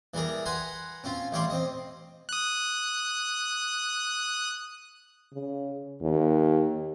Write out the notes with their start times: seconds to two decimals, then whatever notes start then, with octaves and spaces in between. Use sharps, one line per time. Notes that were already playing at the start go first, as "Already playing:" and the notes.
0.14 E3 G3 G#4 A#4
0.46 B4 F#5 G#5 A#5 C6
1.04 C4 C#4 F4
1.32 A1 G3 C#5 F5 C6 D6
1.50 C4 D#5
2.29 D#6 F#6
5.33 C#3
6.02 D#2